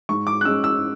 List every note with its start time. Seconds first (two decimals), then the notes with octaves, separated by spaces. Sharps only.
0.09 G#2 C#6
0.27 D6
0.41 F#6
0.45 G#3 C#4 E6
0.64 E6